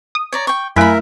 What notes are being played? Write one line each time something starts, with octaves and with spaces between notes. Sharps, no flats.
D#6
C#5 D5 A#5
G5 C#6
F#2 A3 E4 A#4 E5 G#5 B5